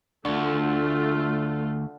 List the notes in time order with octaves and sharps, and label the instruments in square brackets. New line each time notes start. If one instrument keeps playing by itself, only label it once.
[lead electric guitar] D2 [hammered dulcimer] D3 C6 [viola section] A3 F4